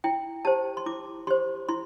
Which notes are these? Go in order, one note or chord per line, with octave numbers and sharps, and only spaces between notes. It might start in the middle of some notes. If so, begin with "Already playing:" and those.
E4 G5
G4 C5 A5
C6
E4 D6
G4 C5 C6
E4 C6